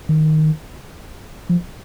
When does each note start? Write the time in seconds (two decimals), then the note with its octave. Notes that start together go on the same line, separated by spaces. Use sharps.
0.09 D#3
1.49 F3